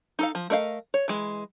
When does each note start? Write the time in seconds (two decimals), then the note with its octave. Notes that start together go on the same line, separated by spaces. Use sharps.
0.19 D#4 A4 F5
0.35 F3
0.50 A3 A#4 D#5 F5
0.94 C#5
1.08 E3 G#3